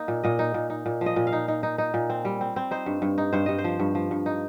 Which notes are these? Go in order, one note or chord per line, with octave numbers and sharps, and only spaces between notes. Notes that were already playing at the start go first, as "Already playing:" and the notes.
Already playing: A#3 D#4
A#2
A#2 D#5
D#4
A#2
D#4
A#2
F3
D#5
A#2
F5
D#4
D#4
D#4
D#4
A#2
C4
G3
C4
C4
D#4 C5
G2
G2
D#4
G2 C5
G2 D#5
C5
F3
G2
F3
G2
D#4